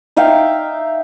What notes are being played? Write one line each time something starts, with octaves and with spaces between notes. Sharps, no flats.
D#4 E5 F5 G5